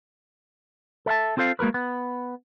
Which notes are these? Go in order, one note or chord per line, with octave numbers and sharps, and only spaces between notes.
A4 E5 F5 A5
C4 F4 A4 C5 F5
G#3 A#3 F#4 A#4 B4
B3